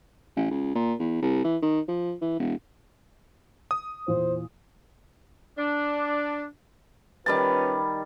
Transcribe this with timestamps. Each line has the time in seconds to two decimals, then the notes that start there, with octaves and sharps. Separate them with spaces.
0.36 A1
0.51 C#2
0.75 A#2
0.99 E2
1.22 C2
1.44 E3
1.62 D#3
1.88 F3
2.21 E3
2.39 E1
3.71 D#6
4.08 E2 A#2 C5
5.58 D4
7.26 D#3 G3 C#4 F4 B4 A5